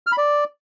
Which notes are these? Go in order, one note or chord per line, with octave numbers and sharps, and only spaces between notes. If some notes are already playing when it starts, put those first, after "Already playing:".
F6
B5
D5